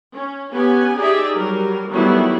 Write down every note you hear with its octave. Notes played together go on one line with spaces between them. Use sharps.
C#4
B3 C#4 G4 G#5
D#4 G4 G#4 D5 E5
F#3 G3 A#4
D#3 F#3 G3 A3 B3 E4